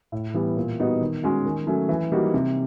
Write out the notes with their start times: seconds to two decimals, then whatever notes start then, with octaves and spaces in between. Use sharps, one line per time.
0.12 A2
0.34 E3 G3 B3
0.57 A#2
0.79 G3 B3 D#4 F#4
1.01 D#3
1.23 G#3 C#4 F#4
1.45 D#3
1.67 F#3 A3 C#4
1.89 E3
2.12 G3 A#3 D#4 F#4
2.34 C3